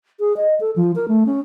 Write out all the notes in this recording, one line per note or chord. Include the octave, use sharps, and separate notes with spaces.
G#4
D#5
A4
F3
A#4
A3
C#4